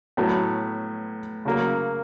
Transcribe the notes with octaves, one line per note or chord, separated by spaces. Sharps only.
A2 F#3 B3
C#3 F#3 A#3